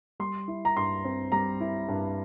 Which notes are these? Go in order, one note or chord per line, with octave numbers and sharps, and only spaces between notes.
G3 C6
E4
A#5
G2 C6
C4
G3 A#5
E4
G2